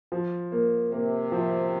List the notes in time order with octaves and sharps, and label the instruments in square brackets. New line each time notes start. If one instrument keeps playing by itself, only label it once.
[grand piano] F3
A#3
[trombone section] C3 [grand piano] A#3
[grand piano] F3